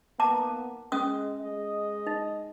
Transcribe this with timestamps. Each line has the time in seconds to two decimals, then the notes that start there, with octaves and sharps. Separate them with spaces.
0.20 D#3 A#3 B3 A5 A#5 D6
0.92 G#3 C#4 D#6
1.41 G#3 D#5
2.07 D#4